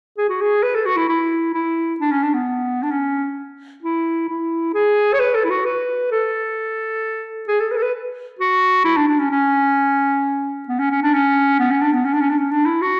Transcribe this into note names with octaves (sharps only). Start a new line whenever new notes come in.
G#4
F#4
G#4
B4
A4
F#4
E4
E4
E4
D4
C#4
D4
B3
D4
C#4
E4
E4
G#4
C#5
B4
A4
E4
F#4
B4
A4
G#4
A4
B4
A4
B4
F#4
E4
D4
D4
C#4
C#4
B3
C#4
C#4
D4
C#4
B3
C#4
D4
B3
C#4
D4
C#4
D4
C#4
D4
E4
F#4